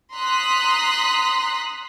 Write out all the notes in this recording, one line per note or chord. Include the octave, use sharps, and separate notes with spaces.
A#5 C6 D#6 F#6 B6